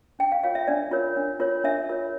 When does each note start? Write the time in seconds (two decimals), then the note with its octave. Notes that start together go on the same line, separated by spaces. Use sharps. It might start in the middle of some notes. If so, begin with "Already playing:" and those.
0.19 D4 G5
0.32 F5
0.44 F4 A#4 C#5 F5
0.55 E5
0.68 D4 D5
0.91 F4 A#4 C#5
1.17 D4
1.40 F4 A#4 C#5
1.64 D4 E5
1.89 F4 A#4 C#5